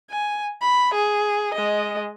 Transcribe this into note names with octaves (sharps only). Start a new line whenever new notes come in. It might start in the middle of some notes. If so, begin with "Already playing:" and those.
G#5
B5
G#4
G#3 D#5